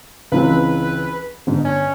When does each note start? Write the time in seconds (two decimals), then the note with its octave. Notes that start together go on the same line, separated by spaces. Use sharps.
0.32 C#2 E3 C4 B4
1.47 G1 G#2
1.65 C#4